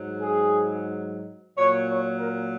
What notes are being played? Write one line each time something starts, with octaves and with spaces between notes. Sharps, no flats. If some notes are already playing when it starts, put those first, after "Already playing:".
Already playing: G#2 F#3
G#4
A#2 F#3 C#5
C#5
A#4